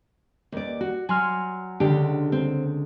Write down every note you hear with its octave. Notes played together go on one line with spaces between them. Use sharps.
D#2 D5
F#4
F#3 G#5 C6 F6
C#2 D3 D4 G4
C4